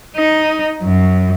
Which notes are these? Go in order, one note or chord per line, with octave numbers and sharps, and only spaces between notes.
D#4
F#2